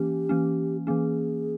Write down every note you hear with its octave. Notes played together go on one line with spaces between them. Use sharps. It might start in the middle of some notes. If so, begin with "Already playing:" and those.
Already playing: E3 A#3 C#4 G4
E3 A#3 C#4
E3 A#3 C#4 G#4